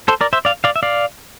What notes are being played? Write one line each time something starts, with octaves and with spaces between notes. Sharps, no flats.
A4 C5
A#4 D5
C5 E5
D5 F5
D5 F5
E5
D5 F5